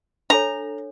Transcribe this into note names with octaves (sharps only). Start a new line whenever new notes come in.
D4 A4 C#5 A#5